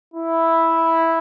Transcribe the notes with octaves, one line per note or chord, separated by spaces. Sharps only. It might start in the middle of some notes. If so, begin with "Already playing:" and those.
E4